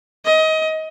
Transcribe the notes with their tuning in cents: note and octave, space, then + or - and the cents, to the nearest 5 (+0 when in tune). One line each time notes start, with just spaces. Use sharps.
D#5 +25